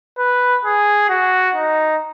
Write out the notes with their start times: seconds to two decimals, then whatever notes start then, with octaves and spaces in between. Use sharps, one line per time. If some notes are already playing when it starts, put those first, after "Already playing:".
0.18 B4
0.65 G#4
1.09 F#4
1.55 D#4